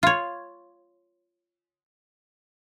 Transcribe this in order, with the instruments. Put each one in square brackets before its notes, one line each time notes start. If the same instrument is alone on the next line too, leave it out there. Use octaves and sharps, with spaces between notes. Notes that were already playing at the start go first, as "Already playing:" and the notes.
[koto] F4 C#5